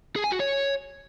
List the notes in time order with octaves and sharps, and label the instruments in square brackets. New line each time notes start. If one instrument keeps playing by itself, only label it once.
[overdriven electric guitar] G#4
G#5
F#4
C#5